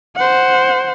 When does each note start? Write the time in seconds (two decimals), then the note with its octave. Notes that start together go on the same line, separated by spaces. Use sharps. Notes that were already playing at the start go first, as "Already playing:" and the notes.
0.16 C5 F#5